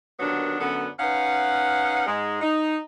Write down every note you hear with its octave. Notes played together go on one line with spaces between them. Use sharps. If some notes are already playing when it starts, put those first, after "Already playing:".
D#2 D3 D#3 F#3 B3 D4
F#2 D3 B3
C#4 D#4 B4 F5 F#5
G#2 G#3
D#4